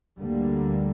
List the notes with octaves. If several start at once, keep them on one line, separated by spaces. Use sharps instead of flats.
D2 D3 G3 A#3